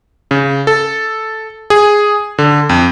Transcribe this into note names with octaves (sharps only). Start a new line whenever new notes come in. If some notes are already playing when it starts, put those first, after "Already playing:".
C#3
A4
G#4
D3
F2